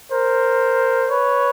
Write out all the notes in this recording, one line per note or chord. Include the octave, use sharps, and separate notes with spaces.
A#4 C5
B4 C#5